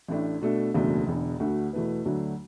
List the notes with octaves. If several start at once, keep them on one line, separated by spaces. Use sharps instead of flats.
A1 A2 A3 D4
B2 A3 D4 A4
F#1 E2 B2 A3 D4
E1 E2 D3
D2 D3 A3 F#4
E2 B2 A3 E4 B4
D2 D3 F#3 A3 D4